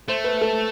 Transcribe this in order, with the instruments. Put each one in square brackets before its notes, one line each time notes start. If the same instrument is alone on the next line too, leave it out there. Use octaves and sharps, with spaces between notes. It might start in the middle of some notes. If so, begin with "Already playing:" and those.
[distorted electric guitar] A3 [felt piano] C5
[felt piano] B4
A4